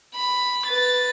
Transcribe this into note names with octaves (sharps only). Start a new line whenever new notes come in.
B5
B4 A6